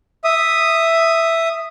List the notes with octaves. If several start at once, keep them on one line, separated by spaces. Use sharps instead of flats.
E5 D#6